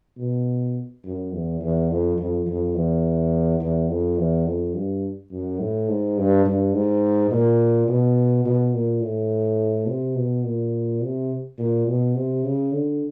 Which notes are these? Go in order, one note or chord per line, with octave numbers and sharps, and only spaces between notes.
B2
F#2
E2
E2
F2
F2
F2
E2
E2
F2
E2
F2
G2
F#2
A2
G#2
G2
G2
G#2
A#2
B2
B2
A#2
A2
C3
B2
A#2
C3
A#2
B2
C3
C#3
D3